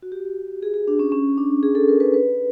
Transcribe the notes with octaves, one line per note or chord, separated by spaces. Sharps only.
F#4
G4
G#4
G#4
D4
C#4
C#4
D4
G#4
A4
A#4
B4
B4